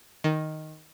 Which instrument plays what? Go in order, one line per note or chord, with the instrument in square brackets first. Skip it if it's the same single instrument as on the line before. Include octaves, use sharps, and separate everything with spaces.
[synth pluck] D#3